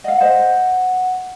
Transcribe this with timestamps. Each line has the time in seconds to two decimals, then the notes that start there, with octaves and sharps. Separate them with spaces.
0.04 D#5 F5 F#5
0.21 C5 D#5